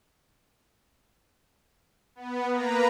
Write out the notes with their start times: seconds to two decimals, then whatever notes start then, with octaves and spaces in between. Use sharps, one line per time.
2.15 B3
2.50 A#3 B4 A#5